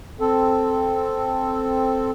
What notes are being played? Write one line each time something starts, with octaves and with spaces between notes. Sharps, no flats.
C4 A4